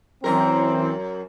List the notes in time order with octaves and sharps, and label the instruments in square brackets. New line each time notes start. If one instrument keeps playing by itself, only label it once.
[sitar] F#2 A#4 [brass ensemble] E3 C4